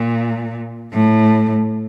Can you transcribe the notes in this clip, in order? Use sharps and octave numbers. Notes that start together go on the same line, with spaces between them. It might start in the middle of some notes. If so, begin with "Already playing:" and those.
Already playing: A#2
A2